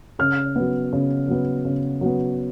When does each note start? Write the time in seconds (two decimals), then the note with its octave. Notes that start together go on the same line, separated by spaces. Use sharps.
0.19 C#3 F6
0.56 F#3 B3
0.93 C#3
1.28 F#3 B3
1.65 C#3
2.01 F#3 B3